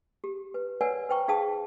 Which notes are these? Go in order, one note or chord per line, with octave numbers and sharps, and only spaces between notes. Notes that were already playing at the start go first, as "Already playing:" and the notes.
G4
B4
A#4 B4 C#5 D5 F#5 G#5
B4 C5 G5 A#5 C#6
D#4 G#4 F5 G5 A5 D#6